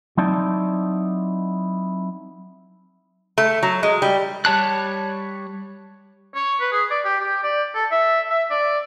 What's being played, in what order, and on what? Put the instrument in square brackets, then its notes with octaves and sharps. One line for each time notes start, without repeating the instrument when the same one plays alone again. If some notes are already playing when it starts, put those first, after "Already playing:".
[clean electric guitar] F#3 C4 D#4 E4 D5 A5
[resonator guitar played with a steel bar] A3
F#3
G#3
G3
[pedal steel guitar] G3 C#5 A5 F#6
[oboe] C#5
B4
G#4
D5
G4
G4
D5
A4
E5
E5
D5